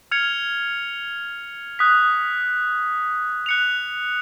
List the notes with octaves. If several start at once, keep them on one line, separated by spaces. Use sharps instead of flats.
F6 G#6 C#7 F7
D#6 F#6 B6
F#6 C#7 F7